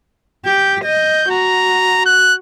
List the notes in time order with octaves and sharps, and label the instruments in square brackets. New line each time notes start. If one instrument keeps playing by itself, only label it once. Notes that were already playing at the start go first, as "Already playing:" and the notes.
[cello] G4 [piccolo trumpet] G6
[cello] D#5 [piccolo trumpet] G6
[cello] F#4 [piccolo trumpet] A#5
[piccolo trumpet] F#6